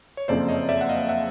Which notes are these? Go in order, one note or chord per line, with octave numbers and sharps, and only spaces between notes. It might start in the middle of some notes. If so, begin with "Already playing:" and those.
C#5
F#1 F2 C#3 F3 C5 D5
C#5 D#5
D5 E5
F#5
D#5 F5
E5 F#5